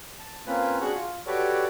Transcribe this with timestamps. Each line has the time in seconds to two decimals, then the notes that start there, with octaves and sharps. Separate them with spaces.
0.19 A5
0.47 A#3 C4 C#4 F4 B4
0.81 D4 F#4 G#4 F#5 C#6
0.94 F4
1.27 F#4 G4 A4 B4 C#5 D5